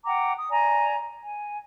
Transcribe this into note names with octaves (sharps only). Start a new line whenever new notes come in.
F#5 G5 A#5 D6
D#6
D5 G#5 A#5
G#5